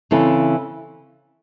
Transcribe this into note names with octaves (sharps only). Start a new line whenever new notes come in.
C#3 E3 C4 E4 A4